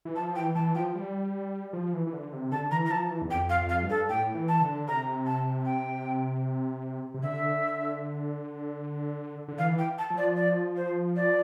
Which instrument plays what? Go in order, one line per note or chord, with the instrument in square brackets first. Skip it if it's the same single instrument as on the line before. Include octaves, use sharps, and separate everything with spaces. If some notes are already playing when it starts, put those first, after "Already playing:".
[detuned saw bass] E3
[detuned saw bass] F3 [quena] A5
[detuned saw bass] E3 [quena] G5
[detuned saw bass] E3 [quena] A5
[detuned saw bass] F3 [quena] G5
[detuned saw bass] G3
F3
E3
E3
D3
C3
[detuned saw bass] D3 [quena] A5
[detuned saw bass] E3 [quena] A#5
[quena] A#5
[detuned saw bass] F3 [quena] A5
[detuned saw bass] E3
E2
[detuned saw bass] F2 [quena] G5
[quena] F5
[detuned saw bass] F2
[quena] F5
[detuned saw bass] G2
[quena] A4
[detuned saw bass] A2 [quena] G5
[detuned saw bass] E3
[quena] A5
[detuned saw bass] D3
[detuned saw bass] C3 [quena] A#5
[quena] A5
G5
[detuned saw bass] C3
[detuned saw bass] D3 [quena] E5
[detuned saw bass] D3
[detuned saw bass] E3 [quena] F5
[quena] G5
A5
[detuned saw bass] F3
[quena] D5
D5
C5
D5